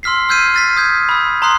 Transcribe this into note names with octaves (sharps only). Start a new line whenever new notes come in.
C6 E6 F6 B6 C7
E6 F6 G6 G#6 C7 D#7
F6 A6 B6
D#6 G6 G#6
B5 E6
A#5 C6 D#6 F#6 C7